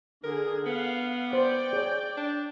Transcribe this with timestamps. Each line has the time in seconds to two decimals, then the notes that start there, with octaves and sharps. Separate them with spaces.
0.24 D3 G#4 A#4
0.66 B3 F5 F#5
1.33 C5 D5 G5
1.73 G#4 C#5
2.17 D4